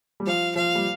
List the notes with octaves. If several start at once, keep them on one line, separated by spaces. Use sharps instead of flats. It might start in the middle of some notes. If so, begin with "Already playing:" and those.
G3
F3 F5
F3 F5
G3